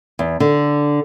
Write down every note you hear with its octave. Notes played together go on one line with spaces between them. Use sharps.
E2
D3